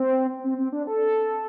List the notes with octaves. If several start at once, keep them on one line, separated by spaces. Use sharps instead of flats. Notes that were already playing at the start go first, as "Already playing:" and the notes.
Already playing: C4
C4
C4
D4
A4